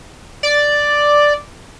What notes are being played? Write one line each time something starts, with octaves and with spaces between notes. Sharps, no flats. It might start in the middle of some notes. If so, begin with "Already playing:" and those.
D5